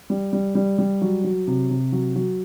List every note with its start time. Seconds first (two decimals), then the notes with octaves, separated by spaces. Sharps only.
0.10 G3
0.33 G3
0.55 G3
0.78 G3
1.02 F#3
1.24 F#3
1.47 C3
1.70 C3
1.92 F#3
2.16 F#3